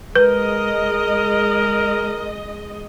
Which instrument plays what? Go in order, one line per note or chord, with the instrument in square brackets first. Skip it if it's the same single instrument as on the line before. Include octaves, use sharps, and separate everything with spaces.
[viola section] G#3 D#5 [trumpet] A#4 [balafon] B4